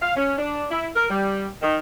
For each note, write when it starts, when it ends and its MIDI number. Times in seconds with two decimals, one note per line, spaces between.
0.02 0.13 77
0.16 0.36 61
0.38 0.66 62
0.71 0.88 64
0.95 1.06 70
1.10 1.47 55
1.62 1.78 51